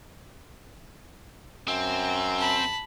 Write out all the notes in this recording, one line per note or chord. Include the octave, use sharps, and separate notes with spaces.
F#2 C4
A5 B5